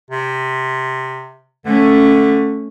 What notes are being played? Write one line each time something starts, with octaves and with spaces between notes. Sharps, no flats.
C3
D3 A3 C#4